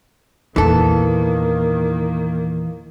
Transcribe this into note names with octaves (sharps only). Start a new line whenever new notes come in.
E2 A#2 D#3 E3 A#3 A4